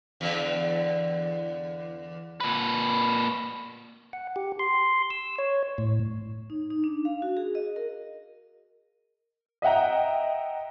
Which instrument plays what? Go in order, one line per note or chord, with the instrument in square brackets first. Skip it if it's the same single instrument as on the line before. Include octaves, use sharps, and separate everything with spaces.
[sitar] E2 D3
[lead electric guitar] A#2 B4
[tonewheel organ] F#5
G4
C6
E6
C#5
A2
[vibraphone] D#4
D#4
D4
F5
F#4
G#4
D#5
A#4
[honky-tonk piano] D#5 E5 F#5 G5 A#5